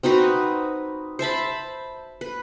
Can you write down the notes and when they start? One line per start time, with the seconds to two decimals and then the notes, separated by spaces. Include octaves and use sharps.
0.03 C4 D#4 F#4 B4
1.19 C5 E5 A5 B5
2.21 B4